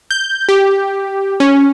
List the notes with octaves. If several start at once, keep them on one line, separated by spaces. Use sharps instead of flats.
G6
G4
C#4